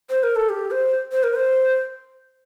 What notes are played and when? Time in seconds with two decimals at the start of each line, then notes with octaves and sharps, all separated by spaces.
0.10 C5
0.23 A#4
0.36 A4
0.49 G4
0.71 C5
1.12 C5
1.23 A#4
1.35 C5